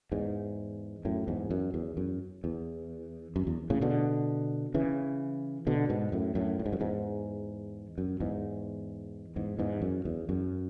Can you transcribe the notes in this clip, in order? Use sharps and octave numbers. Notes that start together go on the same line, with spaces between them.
E2 G#2
F#2 A2
E2 G#2
F#2
E2
F#2
E2
F#2
E2
A2 C#3
B2 D3
C#3 E3
B2 D3
G#2 B2
F#2 A2
F#2 A2
A2
G#2
F#2
E2 G#2
F#2
E2 G#2
E2 G#2
E2 G#2
F#2
E2
F#2